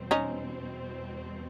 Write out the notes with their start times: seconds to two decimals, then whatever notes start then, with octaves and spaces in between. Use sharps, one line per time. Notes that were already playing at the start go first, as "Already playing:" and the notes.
Already playing: E2 B2 G3 C4
0.11 C#4 D#4